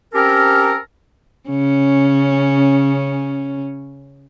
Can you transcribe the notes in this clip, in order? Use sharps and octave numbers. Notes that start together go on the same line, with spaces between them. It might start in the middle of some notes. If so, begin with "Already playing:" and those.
C4 C#4 G4 A4 A#4
C#3 C#4